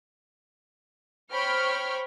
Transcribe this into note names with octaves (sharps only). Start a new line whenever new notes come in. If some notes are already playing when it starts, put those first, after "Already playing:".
C5 C#5 G5 B5 C#6 F6